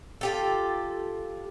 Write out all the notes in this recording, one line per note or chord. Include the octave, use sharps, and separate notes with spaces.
F4 G4 A4